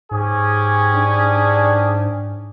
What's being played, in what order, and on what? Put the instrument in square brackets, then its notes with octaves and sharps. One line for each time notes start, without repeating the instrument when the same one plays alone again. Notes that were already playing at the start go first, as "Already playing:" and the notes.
[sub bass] G#2 [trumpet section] C#4 G4 G#4
[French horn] D4